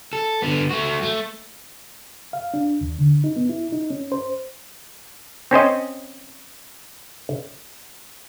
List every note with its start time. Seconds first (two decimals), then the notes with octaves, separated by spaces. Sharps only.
0.13 A4
0.42 D3 B3
0.71 A3 F#4
1.03 A3
2.33 F5
2.54 D4
2.81 D#2
2.99 D3
3.24 D#4
3.36 B3
3.49 E4
3.72 D#4
3.90 C#4
4.12 C5
5.51 C4 C#4 C5 D#5